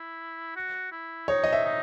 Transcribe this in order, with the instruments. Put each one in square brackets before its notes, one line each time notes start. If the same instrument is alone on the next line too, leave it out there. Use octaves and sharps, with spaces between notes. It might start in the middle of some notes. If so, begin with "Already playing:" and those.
Already playing: [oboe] E4
F#4
E4
[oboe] D#4 [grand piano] C#5
[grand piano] D#5
E5
[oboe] D#4